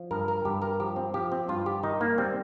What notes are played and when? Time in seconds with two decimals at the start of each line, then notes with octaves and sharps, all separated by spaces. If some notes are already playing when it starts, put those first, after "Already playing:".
Already playing: F3
0.11 G2 A#4
0.28 A#4
0.45 G2 G4
0.62 A#4
0.80 F3 G4
0.96 C4
1.14 F3 G4
1.32 C4
1.48 G2 F4
1.66 G4
1.83 D#3 D#4
2.01 A#3
2.18 G3 C4